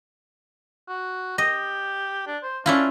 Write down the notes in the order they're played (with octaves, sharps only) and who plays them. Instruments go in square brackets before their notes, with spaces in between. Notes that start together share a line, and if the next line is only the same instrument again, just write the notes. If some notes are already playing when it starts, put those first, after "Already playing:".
[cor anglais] F#4
[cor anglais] G4 [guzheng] D#5
[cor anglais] D4
C5
[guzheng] C#4 E4 F4 [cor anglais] D4